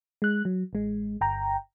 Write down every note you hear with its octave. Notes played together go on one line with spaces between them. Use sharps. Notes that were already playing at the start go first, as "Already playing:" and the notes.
G#3 F#6
F#3
A1 G#3
G1 G5 A#5